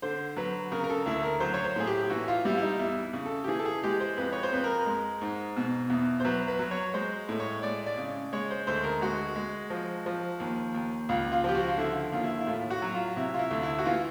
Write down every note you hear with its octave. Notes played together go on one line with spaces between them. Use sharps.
D3 C5
F#3 B4
C#3 A#4
A#4
A4
D2 E4
A#4
F#3 C5
C#5
C5
A2 G#4
G4
E3 F#4
F4
G3 E4
E4
D#4
E2 E4
C#3
A4
G4
E3 G#4
A4
G#4
G#3 G4
C5
F2 B4
C#5
C5
F2 B4
A#4
G#3
G#2
B2
E2
C5
F#3 B4
B4
F#3
C#5
G#3 C5
A2
C#5
G#3 D5
D5
C#3
G#3 C#5
C5
D2 C5
A#4
G#3 F#4
G#3
F3
F3
D#2
D#2
C#2 F4
F4
F3 G4
F#4
F4
D3 E4
D#2 F4
E4
E4
A2 F4
F#4
F#3
F4
C3 E4
F4
E4
D2
E4
F#4
E3 F4